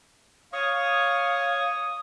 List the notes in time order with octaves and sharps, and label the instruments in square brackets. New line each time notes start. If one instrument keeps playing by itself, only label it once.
[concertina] C#5 C#6 [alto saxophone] F5 [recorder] D#6